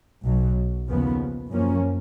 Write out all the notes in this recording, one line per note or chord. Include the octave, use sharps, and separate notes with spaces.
B1 B2 F#3
D#2 C#3 F3 B3
F#2 F3 A#3 C#4